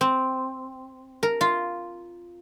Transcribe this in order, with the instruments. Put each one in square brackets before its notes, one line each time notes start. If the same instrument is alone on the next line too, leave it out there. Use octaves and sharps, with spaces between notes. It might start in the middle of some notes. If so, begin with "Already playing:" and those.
[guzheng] C4
A#4
F4